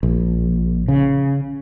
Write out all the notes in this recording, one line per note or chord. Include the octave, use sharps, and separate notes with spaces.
A#1
C#3